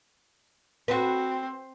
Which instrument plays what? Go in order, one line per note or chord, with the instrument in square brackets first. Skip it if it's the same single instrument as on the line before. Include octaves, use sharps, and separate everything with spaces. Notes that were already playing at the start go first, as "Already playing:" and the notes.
[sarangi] C4 [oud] F#4 B4